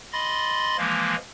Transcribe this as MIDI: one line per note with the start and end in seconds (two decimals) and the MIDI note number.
0.13 0.77 75
0.13 0.77 83
0.13 0.77 84
0.13 0.77 93
0.78 1.15 52
0.78 1.15 53
0.78 1.15 56
0.78 1.15 58